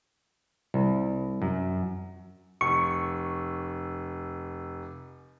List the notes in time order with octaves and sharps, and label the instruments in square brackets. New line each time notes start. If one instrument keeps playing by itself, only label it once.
[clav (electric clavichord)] C2
F#2
[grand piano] F1 [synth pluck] C#6